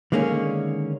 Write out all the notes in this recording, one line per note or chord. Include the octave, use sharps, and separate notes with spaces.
D3 D#3 G#3 A#3 C4 C#4